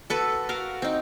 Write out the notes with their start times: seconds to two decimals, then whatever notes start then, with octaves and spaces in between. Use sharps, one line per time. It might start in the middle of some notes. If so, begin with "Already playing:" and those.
0.10 F#4 A4 B4
0.49 F#4 A#4 F5
0.82 C4 D#4